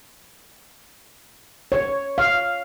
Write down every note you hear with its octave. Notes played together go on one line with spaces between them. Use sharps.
C#5
F5